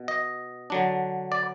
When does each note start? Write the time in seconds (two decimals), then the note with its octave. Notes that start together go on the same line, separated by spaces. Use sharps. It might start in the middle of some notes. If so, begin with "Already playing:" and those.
Already playing: B2
0.08 D#5
0.70 D3 F#3 D4
1.32 D5